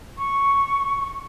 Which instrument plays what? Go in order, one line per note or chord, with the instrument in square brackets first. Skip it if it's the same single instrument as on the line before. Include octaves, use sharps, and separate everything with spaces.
[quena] C#6